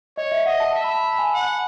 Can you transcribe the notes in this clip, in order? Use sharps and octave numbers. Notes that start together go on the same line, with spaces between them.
C#5 D#5
E5
D#5 F#5
A5
E5 A5
B5
A5
B5
G#5
F#5